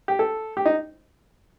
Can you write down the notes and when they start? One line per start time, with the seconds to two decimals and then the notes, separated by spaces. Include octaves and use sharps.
0.08 G4
0.19 A4
0.57 G4
0.66 D#4